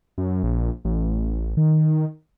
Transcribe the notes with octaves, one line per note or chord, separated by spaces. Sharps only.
F#2
A#1
A1
D#3